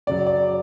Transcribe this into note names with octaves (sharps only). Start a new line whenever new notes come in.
F#2 C#3 F#3 D5
D5